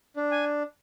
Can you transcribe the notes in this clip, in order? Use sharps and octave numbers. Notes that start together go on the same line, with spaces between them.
D4
G#5